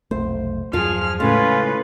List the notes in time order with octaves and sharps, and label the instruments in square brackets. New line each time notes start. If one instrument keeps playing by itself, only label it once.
[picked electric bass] F1 B1 A3 [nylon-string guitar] C5
[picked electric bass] E2 G2 F#3 [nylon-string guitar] F3 F4 [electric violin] G#4 F6
[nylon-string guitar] A2 [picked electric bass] C#3 G#3 [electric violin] C#4 B4 [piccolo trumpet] F4